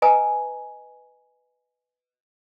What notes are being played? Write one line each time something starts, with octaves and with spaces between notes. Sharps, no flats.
B4 D#5 G#5 A#5 D#6